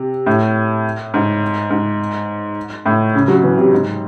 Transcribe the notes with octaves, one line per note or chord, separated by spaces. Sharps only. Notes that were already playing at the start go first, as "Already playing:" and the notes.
Already playing: C3
A2
G#2
G#2
A2
C#3
F#3
E3
C3
G#2